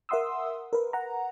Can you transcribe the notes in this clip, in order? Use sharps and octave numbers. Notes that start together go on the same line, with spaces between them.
A#4 E5 F#5 C6 D#6 E6
A#4 B4
F#5 A#5